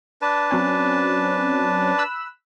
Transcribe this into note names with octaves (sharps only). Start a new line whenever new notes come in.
D4 B4 A5
F#3 C4 C#4
B5 E6 F#6